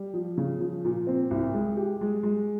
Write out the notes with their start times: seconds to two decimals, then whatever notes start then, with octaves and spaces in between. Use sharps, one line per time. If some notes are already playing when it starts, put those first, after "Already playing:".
Already playing: G3
0.14 F3
0.37 C#3
0.60 F3
0.85 A#2
1.07 C4
1.31 C2
1.54 G#3
1.77 G4
2.01 G#3
2.23 G#3